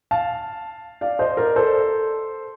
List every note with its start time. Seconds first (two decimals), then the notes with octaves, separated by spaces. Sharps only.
0.11 F5 A5
1.01 D5 F5
1.19 C5 D#5
1.37 A#4 D5
1.56 A4 C5